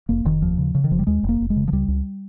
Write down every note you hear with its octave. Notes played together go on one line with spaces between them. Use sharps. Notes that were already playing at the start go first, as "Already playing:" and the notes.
F1 A#3
F1 D#3
D#2 F3
C#3
C#3
D#3
F1 F3
G3
D#2 G#3
F1
A#3
F1
G#3
C#3
F3
C#2 G3
C#2